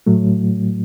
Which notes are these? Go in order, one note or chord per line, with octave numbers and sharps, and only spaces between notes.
A2 F#3 A3